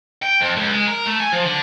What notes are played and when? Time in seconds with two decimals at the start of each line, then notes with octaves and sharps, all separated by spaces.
0.23 G5
0.41 F2
0.57 C#2
0.72 G#3
0.87 A#4
1.06 A3
1.20 G#5
1.32 F3
1.44 D3